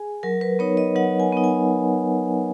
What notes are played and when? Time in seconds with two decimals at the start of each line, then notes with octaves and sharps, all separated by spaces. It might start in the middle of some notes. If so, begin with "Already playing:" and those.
Already playing: G#4 G#5
0.23 F#3 A#4
0.41 B4
0.59 B3 D#4 C#5
0.77 D#5
0.96 F#3 F#5
1.20 G#5
1.33 B3 D#4
1.44 G#5